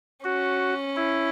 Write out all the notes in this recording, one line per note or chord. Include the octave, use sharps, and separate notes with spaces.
C#4 F#4
E4